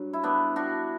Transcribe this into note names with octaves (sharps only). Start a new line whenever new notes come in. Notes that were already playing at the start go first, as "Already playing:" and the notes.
Already playing: G2 F#3
E4
B3 D4
D4 F#4